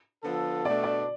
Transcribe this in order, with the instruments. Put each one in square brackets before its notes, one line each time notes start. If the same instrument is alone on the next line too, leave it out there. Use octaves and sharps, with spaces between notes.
[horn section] D3 F3 B3 F4 A4
[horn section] B2 A3 D4 [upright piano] D5
[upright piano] D5